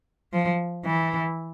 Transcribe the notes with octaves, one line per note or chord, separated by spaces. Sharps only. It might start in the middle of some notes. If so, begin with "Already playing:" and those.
F3
E3